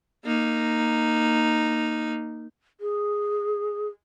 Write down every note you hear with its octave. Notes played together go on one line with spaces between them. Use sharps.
A#3 D#4
G#4